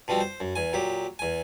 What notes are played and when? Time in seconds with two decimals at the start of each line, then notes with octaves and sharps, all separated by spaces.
0.08 B2 F3 G3 C4
0.20 C5
0.40 F#2
0.56 E2 G#5
0.73 A#2 F#3 G4
1.19 E2 G#5